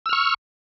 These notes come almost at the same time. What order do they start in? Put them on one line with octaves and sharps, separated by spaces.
E6 F6 C#6